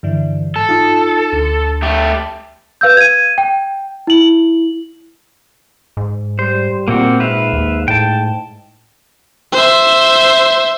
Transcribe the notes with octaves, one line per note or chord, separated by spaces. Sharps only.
G2 D3 E3
G#2 A4
D#4 F4
D2
A3 G4
B4 F5 E6 G6
G#6 D#7
G5
E4 F#7
G#2
G3 C5
A#2 A#3 C4 F#4
G#2 B4 E5 F5
D#2
A2 G5 A5
C5 E5